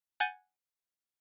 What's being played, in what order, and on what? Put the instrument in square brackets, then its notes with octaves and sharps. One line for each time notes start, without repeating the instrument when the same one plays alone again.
[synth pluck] F#5 G#5 F#6 G6 A6 D#7